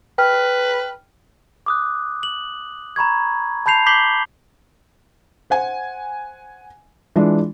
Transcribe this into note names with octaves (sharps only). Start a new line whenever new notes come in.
B4 G5 F6
D6 D#6 F#6
F#7
A#5 B5 C#6 G#6
A5 B5 G6 C7 F7
D6 G6 B6 C7 F#7 G7
C5 F#5 G#5
E3 G#3 D4 F4